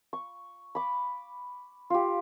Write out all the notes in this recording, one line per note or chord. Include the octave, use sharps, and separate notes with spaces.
C#6
B5 D6
F4 G4